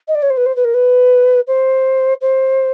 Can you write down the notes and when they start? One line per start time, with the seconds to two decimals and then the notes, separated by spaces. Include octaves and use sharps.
0.08 D#5
0.15 D5
0.22 C#5
0.30 C5
0.37 B4
0.46 C5
0.56 B4
0.64 A#4
0.74 B4
1.47 C5
2.21 C5